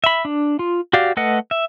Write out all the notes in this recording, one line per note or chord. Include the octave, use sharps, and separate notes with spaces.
E5 B5
D4
F4
F#4 G4 D5 F5
A3 A4 B4 D#5 F#5
E5